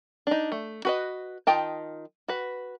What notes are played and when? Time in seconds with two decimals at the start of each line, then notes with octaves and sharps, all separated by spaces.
0.27 D4 D#4
0.52 A3
0.85 F#4 B4 D#5
1.47 D#3 F4 D#5 G5 A5
2.28 F#4 B4